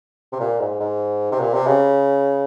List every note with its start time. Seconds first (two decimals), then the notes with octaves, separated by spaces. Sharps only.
0.32 C3
0.40 A#2
0.60 G#2
0.80 G#2
1.32 C3
1.40 A#2
1.54 C3
1.67 C#3